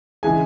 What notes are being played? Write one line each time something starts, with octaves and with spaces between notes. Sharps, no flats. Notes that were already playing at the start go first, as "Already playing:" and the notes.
C#3 E3 G#3 G#5